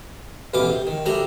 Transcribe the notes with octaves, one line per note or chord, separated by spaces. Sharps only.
A1 B2 E3 F4 D6 D#6
C3
D#3
D2 G3 D4 E5 A#5